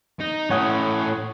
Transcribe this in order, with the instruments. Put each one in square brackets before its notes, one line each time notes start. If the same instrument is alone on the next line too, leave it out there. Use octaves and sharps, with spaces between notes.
[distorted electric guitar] D#4
[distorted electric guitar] A2 C#4 [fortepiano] C#5 F#5 D#6